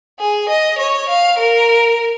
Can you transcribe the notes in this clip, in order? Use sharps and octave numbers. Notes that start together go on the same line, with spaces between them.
G#4
D#5
C#5
F5
A#4